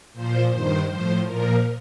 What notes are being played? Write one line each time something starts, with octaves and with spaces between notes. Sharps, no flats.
A#2 F3 C5
G2 D#3 C5
A2 F3 C5
A#2 F3 A#4